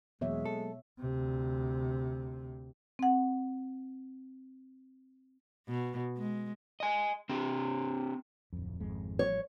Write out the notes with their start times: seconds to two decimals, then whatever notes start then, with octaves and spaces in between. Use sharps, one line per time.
0.21 E2 B2 F#3 G#3 A#3 B3 C#5 E5
0.45 A4
0.99 D2 C3
2.99 C4 F#5
5.68 B2
6.17 G#3
6.80 D#5 G#5
7.29 C4 D4 G4
8.53 D1 F2
8.80 G#1 F2 G#3
9.19 A1 F3 G3 C#5